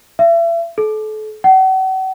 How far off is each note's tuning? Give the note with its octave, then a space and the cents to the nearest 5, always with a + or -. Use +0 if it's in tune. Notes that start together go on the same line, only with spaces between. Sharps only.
E5 +35
A4 -35
F#5 +40